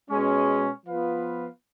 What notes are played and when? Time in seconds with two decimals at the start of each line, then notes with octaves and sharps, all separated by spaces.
0.10 B2 G#3 C#4
0.86 F3 B3 F4 B4 F5